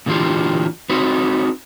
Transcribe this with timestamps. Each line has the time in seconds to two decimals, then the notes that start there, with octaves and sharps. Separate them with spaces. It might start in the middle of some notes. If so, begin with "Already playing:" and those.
0.06 A#2 D3 E3 G#3 F4 G4
0.89 C4 D#4 F#4 B4